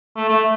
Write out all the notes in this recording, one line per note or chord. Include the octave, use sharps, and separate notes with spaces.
A3
A3